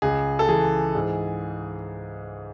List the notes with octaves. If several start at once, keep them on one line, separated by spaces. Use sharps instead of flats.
C#2 G#4
A4
E3 G#4
G#2